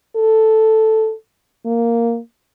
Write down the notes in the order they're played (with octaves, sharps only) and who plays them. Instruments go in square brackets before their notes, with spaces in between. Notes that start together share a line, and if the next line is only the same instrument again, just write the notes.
[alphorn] A4
A#3